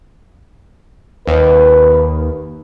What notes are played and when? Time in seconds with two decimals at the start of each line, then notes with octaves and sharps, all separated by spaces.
1.27 D#2 B4